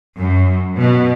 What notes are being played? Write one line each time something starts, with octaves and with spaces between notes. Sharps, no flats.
F#2
B2